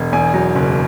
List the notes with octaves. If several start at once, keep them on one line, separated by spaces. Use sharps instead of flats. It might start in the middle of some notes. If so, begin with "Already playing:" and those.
Already playing: E1
E2 G#5
F#3
F#1